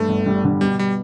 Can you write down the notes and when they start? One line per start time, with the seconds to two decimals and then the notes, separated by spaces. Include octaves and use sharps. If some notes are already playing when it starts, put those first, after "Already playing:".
Already playing: G2 A3
0.09 G1
0.26 G3
0.44 D3
0.61 B2 G3
0.79 G3